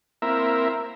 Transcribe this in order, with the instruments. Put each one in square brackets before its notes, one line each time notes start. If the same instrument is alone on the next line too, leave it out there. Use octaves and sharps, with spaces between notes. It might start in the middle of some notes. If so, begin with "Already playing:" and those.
[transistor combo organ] A#3 C4 E4 A#4 E5